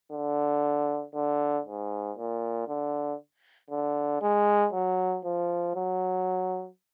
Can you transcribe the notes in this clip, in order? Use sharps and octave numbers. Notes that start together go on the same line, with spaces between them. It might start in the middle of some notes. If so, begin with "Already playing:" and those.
D3
D3
G#2
A#2
D3
D3
G#3
F#3
F3
F#3